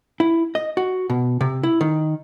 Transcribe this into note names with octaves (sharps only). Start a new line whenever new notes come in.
E4
D#5
F#4
B2
C3
E4
D#3